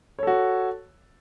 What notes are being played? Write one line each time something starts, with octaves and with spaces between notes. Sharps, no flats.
F#4 A4 C#5